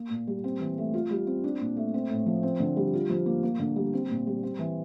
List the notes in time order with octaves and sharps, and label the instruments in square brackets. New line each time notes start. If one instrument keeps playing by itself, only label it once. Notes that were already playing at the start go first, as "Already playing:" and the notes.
Already playing: [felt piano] A#3
A#2
G3
C4
E3
A3
F4
G3
C4
D4
A#2
A3
C4
A2
F3
C4
D3
G3
F4
F3
A#3
A#3
D3
G3
C4
A#2
G3
C4
E3